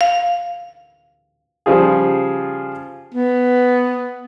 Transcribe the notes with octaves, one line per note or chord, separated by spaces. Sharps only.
F5
C#3 F3 G3 F4 G#4
B3